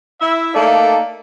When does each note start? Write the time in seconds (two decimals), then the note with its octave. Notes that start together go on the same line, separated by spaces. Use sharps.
0.21 E4 E5
0.55 A3 A#3 D#4 A4 D5